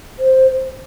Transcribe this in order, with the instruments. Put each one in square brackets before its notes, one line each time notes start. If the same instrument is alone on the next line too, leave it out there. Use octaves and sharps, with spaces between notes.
[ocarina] C5